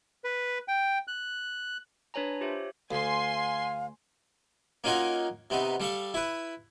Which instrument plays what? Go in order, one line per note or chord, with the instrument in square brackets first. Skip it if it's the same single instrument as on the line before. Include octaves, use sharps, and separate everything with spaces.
[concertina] B4
G5
F#6
[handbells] D4 B4 C#5 G#5 A#5
F4 G4 C5 C#5 E5
[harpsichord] D2 [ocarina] F5 [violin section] G#5 C6
[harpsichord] A#3 C#4 D#4 F4 F#4 A#4
C3 B3 D#4
G3 A4 F5 C#6
E4 B4